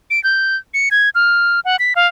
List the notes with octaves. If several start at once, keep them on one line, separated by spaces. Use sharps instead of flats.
D7
G6
C#7
G#6
F6
F#5
B6
F5